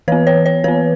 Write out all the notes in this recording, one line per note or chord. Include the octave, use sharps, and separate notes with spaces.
E3 B3 B4
C#5
C#5
E3 B3 B4